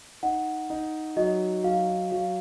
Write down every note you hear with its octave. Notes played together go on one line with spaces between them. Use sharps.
D#4 F#5
D#4
F#3 D#5
F#3 F5
F#3 F5